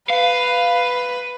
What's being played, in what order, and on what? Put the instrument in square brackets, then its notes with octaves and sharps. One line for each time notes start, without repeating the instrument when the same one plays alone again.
[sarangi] B4 [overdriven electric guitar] F5